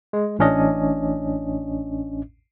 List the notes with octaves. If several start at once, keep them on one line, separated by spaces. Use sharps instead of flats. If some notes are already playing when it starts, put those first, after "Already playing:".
G#3
A1 A2 C#4 D4 D#5